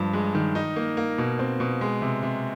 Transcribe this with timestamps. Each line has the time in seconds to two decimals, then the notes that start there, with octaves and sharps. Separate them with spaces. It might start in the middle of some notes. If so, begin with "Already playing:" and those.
Already playing: G2 F3
0.13 G#3
0.35 D#3
0.55 D#4
0.76 A#3
0.97 A#3
1.18 B2
1.39 C4
1.60 B2
1.81 G#3
2.02 C3
2.23 C3